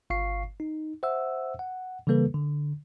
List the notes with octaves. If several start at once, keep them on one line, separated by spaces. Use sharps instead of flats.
G1 F5 C#6 C7
D#4
C5 E5 F#5 E6
F#5
C#3 E3 G3 A#3 A4 B4
D3